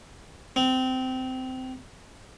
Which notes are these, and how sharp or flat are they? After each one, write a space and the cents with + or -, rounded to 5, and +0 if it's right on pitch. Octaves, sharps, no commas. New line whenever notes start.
C4 -20